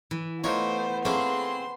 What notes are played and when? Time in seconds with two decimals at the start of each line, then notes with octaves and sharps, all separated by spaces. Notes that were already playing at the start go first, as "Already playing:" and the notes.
0.11 E3
0.44 E3 A3 B3 D#4 F4 C5 C#5
1.05 A3 A#3 C4 C#4 G#4 C6